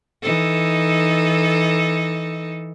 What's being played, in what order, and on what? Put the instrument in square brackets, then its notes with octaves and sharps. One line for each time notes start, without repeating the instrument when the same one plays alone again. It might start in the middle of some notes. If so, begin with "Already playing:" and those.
[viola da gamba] E3 D#4 A4